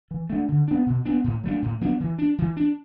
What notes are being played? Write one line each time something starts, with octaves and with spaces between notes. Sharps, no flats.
E3
A3 D4
D3
B3 D4
B2
B3 D4
A2
F#3 A3 D4
A2
F#3 B3 D4
E3
D4
E3
D4